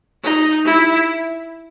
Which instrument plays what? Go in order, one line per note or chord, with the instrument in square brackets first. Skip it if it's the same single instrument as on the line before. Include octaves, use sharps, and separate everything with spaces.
[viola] D#4
E4